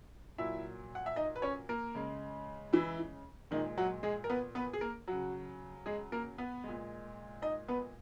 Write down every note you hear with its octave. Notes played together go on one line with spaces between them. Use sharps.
A#2 F#3 E4 E5
F#5
E5
D#4 D#5
B4
C#4 C#5
A#3 A#4
C#3 G#3
E3 E4
A#2 D#3 G#3 D#4
F#3 F#4
G#3 G#4
A#4
B3 B4
B3 B4
G#4
A#3 A#4
C#3 F#3 F#4
G#3 G#4
A#3 A#4
B3 B4
A#2 G#3
D#4 D#5
B3 B4